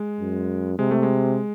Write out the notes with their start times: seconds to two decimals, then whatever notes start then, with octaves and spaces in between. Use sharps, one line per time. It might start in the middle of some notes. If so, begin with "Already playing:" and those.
Already playing: G#3
0.20 F#2
0.79 C3 G#3
0.91 A3
1.03 G#3